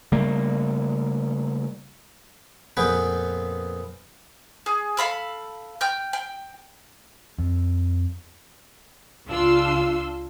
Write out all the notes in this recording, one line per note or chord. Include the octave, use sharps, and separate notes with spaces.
C#3 G3 A3 A#3
F2 A#2 B3 G#4 B4 G5
G#4
A4 F5 B5 E6
G5 F6 G6
G5
F2
C#2 D4 F4 F5 C6 E6